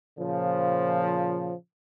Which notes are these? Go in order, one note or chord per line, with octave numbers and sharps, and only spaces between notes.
A#2 C#3 F3